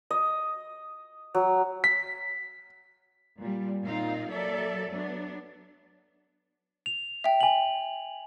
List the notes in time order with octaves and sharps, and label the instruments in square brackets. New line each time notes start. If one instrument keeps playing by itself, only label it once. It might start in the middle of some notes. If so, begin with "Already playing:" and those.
[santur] D#5
F#3
[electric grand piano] B6
[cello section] A#2 G3
A#2 C4 D#4 F4 F5
F#3 A#3 A4 D5 E5
F#3 B3 D4
[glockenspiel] F7
[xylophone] E5 G5
[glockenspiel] G#5 F#7